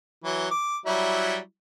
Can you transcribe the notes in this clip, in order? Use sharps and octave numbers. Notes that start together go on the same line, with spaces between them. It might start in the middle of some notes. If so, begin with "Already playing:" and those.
E3 F#3
D6
F#3 G3 E4